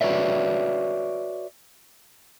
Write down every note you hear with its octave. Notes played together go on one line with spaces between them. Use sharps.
F#4 B4 C#5 D5 E5